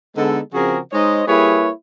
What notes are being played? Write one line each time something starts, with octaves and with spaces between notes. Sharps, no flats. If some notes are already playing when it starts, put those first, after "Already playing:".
D3 G#3 B3 D#4 A4
C#3 F3 C4 F#4 G#4 A#4
G#3 D#4 C5 C#5 D#5
G3 A#3 E4 G#4 B4 C#5